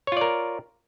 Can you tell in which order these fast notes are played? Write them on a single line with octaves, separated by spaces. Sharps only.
C#5 F4 D5 A#4